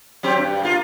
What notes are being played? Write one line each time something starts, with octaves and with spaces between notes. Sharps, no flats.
F#3 C4 G4
G2
A#3 F4